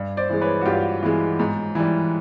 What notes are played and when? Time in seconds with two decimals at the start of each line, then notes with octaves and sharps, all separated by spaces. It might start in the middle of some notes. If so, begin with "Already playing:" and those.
Already playing: G2
0.17 C5 D5
0.29 E3 G#3
0.41 B4 C#5
0.61 F#4
0.66 G2 F4 G4
1.03 E3 G#3
1.39 G#2
1.75 E3 G3